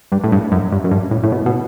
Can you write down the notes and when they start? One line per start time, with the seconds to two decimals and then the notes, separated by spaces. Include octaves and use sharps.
0.12 G2
0.24 A2
0.32 G2
0.52 F#2
0.72 G2
0.84 F#2
0.91 G2
1.11 A2
1.23 A2
1.32 B2
1.46 B2